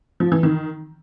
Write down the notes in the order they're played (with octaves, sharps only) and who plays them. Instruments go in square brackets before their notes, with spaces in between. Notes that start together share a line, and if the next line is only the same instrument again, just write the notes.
[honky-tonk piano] F3
E3
D#3